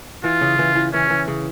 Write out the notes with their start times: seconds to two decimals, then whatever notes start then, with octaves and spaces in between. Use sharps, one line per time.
0.24 E3 F4
0.41 C#3
0.59 E3
0.75 E3
0.93 E3 C#4
1.10 E3
1.28 C#3